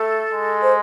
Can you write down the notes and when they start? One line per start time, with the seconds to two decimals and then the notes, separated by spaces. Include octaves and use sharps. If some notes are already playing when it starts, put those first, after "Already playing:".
Already playing: A3 A4
0.33 G#3
0.62 C5